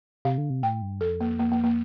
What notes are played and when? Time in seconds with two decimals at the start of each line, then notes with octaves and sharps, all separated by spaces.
0.25 C3 F5
0.38 D3
0.50 C3
0.63 A2 G5
0.82 G2
1.01 F2 A4
1.21 A#3
1.39 A#3
1.52 A#3
1.64 A#3